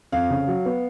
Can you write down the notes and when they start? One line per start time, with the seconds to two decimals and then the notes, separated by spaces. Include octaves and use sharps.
0.12 F2 F5
0.30 C#3
0.47 F#3
0.66 B3